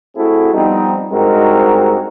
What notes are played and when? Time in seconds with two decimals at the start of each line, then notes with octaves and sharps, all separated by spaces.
0.16 A3 C4 E4 F#4 G#4 A4
0.53 F3 G3 B3 C4 D#4
1.11 G2 G#3 C4 D#4 F#4 A#4